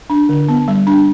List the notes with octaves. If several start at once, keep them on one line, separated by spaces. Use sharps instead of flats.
D4
D3
B3
G3
D4